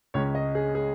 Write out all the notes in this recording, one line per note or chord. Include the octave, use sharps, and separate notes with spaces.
C#2 C#3 G#3 C#4 C#5
D#5
G#4
G#4